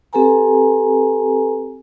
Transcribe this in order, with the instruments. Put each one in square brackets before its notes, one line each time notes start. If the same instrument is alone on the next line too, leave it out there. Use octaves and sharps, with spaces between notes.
[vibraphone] C4 G4 A4 B4 G#5 A#5